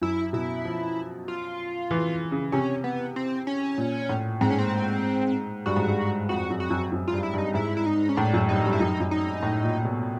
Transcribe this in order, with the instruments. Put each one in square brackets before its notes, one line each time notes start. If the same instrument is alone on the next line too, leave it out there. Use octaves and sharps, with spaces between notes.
[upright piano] F#2 [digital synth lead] E4
[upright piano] B2 [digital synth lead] E4
[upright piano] F3
[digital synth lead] F4
[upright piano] E3
C#3
[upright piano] C3 [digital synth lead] C#4
[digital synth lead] B3
C4
C#4
[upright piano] A#2
A2
[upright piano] G#2 [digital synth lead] C4
[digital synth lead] C#4
C4
[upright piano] G2 [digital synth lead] F#4
[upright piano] G#2
G2
[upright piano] F2 [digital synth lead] F#4
[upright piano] F#2
[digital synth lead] F#4
[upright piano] F#2
F#2
[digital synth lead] F4
[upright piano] G2
[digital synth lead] E4
[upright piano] G2 [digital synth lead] D#4
[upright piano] G#2 [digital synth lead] E4
[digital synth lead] E4
D#4
C#4
[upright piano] A2 [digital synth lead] D4
[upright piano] F#2
[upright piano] G2 [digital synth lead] D#4
[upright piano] G2
[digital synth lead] E4
[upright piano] F#2 [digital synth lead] D#4
[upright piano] F#2
[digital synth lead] D#4
[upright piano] A2
A#2
B2